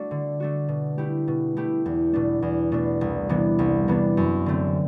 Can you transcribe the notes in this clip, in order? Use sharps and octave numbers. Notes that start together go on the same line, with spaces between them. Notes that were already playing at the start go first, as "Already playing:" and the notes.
Already playing: A3 D4 F#4
D3
A3 D4 F#4
B2
A3 E4 G4
B2
A3 E4 G4
E2
B2 A3 D4
E2
B2 A3 D4
C2
C3 E3 B3 D4
C2
C3 E3 B3 D4
F#2
D3 A3 C4